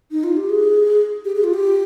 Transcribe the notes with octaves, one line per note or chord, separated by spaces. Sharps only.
D#4
F4
G4
G#4
G4
G#4
F4
G4